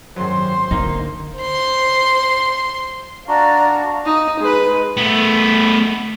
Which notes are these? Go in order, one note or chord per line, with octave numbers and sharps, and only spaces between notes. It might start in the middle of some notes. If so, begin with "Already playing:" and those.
G#1 F#2 F#3 C5 C6
D3 A#3 D#4
C5 C6
D4 F#4 D5 F5 A#5
D#4
G#3 B4
A3 B3